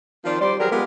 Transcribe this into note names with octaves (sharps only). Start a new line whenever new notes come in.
D#3 F3 C4 F4 C5 D5
G3 C5 D5
F#3 G4 G#4 A#4
G#3 B3 F4 G4 A#4